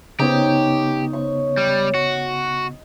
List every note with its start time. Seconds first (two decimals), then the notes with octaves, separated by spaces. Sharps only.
0.20 C#3 B3 D#4 G4 C#5
1.13 C#5 C#6
1.57 G3
1.95 F#4